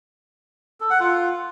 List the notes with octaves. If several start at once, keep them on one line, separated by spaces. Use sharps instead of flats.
A4
F#5
F4